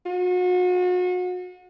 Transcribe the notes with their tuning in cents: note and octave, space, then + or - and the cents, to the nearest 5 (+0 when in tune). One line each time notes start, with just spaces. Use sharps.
F#4 -40